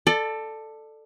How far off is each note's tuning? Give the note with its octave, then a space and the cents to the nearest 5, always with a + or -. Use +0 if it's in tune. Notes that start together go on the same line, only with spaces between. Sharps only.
A4 +5 D5 +25